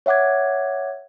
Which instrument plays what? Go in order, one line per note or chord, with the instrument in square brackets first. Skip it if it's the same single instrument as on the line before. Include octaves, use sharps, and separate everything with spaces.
[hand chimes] C#5 E5 F#5 D6 G#6